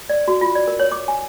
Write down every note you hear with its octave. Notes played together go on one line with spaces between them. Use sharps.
D5
F#4
F4
D5
A#4
C#5
D6
G#5